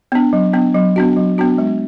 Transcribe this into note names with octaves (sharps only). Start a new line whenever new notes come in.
B3 D4
F#3
B3 D4
F#3
B3 D4 F#4
F#3
B3 D4 F#4
G#3